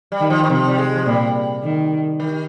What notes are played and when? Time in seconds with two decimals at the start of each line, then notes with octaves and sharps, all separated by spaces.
0.12 G3
0.20 D#3
0.30 F3
0.43 D#3
0.49 C3 F3
0.68 G3
0.78 G#3
0.96 F3
1.06 A#2 G3
1.63 D#3
2.20 D#3